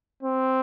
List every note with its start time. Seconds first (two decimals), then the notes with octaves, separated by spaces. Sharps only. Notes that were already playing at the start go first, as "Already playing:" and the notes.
0.23 C4